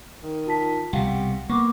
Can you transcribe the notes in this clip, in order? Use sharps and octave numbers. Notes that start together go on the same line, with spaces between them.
D#3
F4 A5 B6
C2 B2 G4 F5 F#5
A#3 B3 C#6 D6